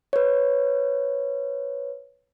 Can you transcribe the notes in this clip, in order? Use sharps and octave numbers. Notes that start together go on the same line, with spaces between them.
B4 C#5